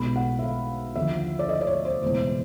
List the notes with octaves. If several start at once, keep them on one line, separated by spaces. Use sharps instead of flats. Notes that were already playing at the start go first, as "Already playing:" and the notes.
Already playing: B1 B2 G#3 B5
F#5
E5
F5
D#2 D3 F3 E5
D5
D#5
D5
C#5
C5
F#1 E2 B2 G#3 C5